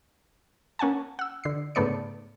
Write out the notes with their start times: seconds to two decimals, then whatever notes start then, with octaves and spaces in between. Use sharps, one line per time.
0.79 A#3 C#4 F#5 G#5 A5
1.19 F#5 E6
1.44 D3 C7
1.75 G#2 C#3 A3 B3 D5 C#7